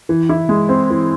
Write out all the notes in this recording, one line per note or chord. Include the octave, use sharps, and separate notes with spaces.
E3
E4
G#3
C4
E3